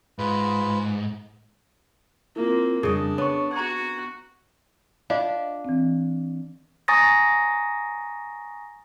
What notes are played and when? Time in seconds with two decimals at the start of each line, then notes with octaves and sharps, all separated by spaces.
0.19 G#2 F4 B4
2.36 A#3 C4 E4 F4
2.83 F2 C#3 G3 D4 D#5
3.18 B3 C#5 C#6
3.53 F#4 F#5 A#5 C#6 G#6
5.10 D4 F4 D#5 F5
5.65 E3 C4
6.88 G#5 A#5 C#6 D#6 A6 A#6